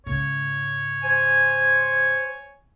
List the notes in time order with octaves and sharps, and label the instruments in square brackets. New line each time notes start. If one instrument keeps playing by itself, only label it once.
[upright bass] G#2 C#3 [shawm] C#5
[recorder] C5 [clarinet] G#5